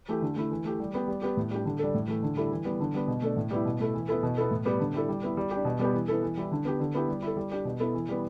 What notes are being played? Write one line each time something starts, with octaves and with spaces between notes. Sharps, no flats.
E3 A3 G4
D3
A3 E4
E3
A3 G4
G3
B3 G4
G3
B3 G4
A2
G3 D4 G4
D3
G3 D4 A4
A2
E3 A3
D3
G3 E4 A4
E3
G3 B3
D3
G3 B3
B2
A3 D4 A4
A2
G3 B3 E4
B2
A3 E4 A4
E3
B3 E4 A4
B2
B3 E4 A4
A2
G3 B3 G4
D3
G3 E4 A4
G3
B3 E4
G3
D4 G4
B2
G3 B3 G4
E3
B3 E4 A4
E3
G3 E4
D3
B3 G4
D3
B3 E4 G4
G3
E4 A4
G3
D4 G4
B2
B3 E4 A4
E3
G3 B3